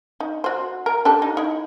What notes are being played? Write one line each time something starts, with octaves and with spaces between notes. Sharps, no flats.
D#4
F#4 C5
A#4
D4 G4 A4
D#4
D#4 E4